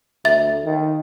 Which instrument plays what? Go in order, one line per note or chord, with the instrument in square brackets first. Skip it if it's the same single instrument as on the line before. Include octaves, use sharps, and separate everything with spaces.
[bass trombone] D2 [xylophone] E5 A6
[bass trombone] D#3